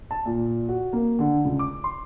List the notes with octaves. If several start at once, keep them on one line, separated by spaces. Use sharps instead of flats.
A5
A#2
F#4
A#3
D3
C#2
D6
C6